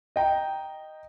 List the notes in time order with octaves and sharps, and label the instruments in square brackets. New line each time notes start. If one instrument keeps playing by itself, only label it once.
[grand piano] D#5 G5 A#5